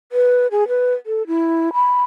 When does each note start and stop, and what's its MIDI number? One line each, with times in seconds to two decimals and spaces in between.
0.12 0.47 71
0.51 0.68 68
0.68 0.93 71
1.06 1.26 69
1.27 1.73 64
1.73 2.03 83